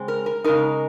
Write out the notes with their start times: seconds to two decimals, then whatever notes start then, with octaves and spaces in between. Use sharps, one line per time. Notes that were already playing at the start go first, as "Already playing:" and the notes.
Already playing: C#3 G#3 C4
0.08 A#4
0.26 A#4
0.44 C#3 G#3 D#4 A#4